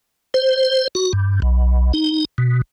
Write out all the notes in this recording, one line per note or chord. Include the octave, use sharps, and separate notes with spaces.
C5
F#4
G2
B1
D#4
B2